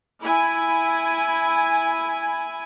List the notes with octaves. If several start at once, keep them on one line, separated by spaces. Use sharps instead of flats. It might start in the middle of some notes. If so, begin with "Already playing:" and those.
E4 G#5